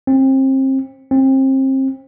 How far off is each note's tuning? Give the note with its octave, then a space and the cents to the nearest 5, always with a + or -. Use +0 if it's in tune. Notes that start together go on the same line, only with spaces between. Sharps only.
C4 +30
C4 +30